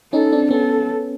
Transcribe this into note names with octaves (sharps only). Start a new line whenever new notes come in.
C#4 D#4 A4
C4 D4
B3 C#4 A4